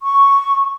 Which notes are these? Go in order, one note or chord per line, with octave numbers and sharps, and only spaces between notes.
C#6